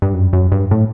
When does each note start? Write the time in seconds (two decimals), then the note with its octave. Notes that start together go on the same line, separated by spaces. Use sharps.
0.02 G2
0.14 F#2
0.33 F#2
0.52 G2
0.71 A2